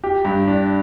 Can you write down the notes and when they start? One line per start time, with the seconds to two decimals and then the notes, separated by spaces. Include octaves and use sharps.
0.04 G4
0.25 G2
0.48 D4